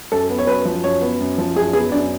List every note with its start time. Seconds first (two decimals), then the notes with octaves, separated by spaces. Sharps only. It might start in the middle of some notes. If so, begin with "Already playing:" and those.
0.12 F#2 A4
0.30 B3
0.38 C#5
0.47 F#2 B4
0.65 F3
0.84 F#2 C#5
1.01 B3
1.20 F#2
1.38 F3
1.56 F#2 G#4
1.73 B3 G#4
1.91 F#2 D4